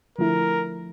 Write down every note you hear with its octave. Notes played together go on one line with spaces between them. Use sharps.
D3 F3 A3 E4 A#4